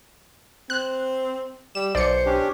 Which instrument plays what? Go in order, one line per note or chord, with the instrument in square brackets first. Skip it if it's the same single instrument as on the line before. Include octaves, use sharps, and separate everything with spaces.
[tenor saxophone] C4 [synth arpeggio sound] F#6
[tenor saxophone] G3 [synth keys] E7
[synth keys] B1 [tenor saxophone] C5 [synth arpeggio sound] D5 C#7
[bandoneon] C#4 D4 G4